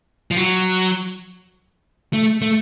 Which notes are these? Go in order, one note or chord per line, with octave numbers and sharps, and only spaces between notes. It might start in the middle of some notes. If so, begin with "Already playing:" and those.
F3
F#3
A3
A3